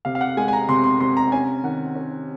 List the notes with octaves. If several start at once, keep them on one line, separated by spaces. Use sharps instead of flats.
C3 F5
F5
F#5
G#3 G#5
G#5
A#5
C3 C6
C6
C3 C6
A#5
C#4 G#5
D#3 F#5
C#4